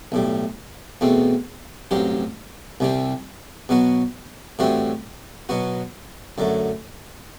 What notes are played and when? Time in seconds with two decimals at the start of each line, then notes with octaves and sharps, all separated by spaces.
0.12 B1 A2 G3
1.01 E2 B2 A3 C4
1.91 A1 G2 F#3 C4 G4
2.80 C2 C3 G3 C4
3.69 B2 F#3 B3 F#4
4.59 A2 E3 G3 C4 F#4
5.49 B2 F#3 B3 F#4
6.38 F#2 D3 F#3 A3